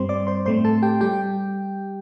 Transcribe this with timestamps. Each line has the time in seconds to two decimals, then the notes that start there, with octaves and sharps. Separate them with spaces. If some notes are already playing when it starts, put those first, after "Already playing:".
Already playing: G2 G3 C4 C5 C6
0.09 D5 D6
0.27 C5 C6
0.46 A2 A3 C4 C5 C6
0.65 A4 A5
0.83 G4 G5
1.01 G3 G4 G5